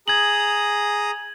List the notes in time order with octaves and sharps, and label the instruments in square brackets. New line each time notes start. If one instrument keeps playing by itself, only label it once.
[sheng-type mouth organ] G#4 A#5 D#6 [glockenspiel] G#6 F#7